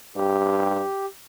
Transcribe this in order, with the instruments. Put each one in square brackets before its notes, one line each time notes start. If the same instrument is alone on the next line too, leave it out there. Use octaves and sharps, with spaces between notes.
[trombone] G2 [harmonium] G4